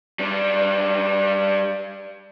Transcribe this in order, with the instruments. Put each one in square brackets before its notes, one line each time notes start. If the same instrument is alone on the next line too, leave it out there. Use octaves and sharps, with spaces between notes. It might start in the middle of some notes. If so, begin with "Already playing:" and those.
[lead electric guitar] G3 D4